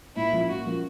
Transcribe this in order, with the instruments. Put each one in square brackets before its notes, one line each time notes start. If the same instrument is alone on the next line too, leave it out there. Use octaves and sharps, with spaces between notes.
[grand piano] A#2 [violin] E4
[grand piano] F3 A#3 C#4 F4
[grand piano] A#2 [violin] F#4
[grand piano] F3 A#3 C#4 F4